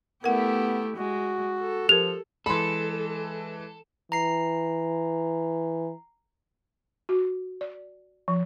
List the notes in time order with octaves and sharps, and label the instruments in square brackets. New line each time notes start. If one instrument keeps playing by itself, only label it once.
[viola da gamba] A3 E4 G4 [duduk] B3 [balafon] A#4 F#5
[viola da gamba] G#3 [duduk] F#4
[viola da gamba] A4
[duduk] F3 [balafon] G4 A#4 [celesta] F7
[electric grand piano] E3 G#3 [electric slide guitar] A4 [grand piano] B5 C6
[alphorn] E3 [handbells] A#5 C7
[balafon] F#4
D5
F3